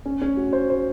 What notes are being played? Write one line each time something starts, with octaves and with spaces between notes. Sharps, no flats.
C#4
C#4
F#4
C5
C5